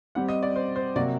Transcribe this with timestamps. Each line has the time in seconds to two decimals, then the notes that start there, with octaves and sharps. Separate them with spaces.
0.15 G3 C4 G4 F#5
0.29 D#5
0.43 D5
0.56 C5
0.76 C5
0.95 C3 F#3 A#3 F#4 D5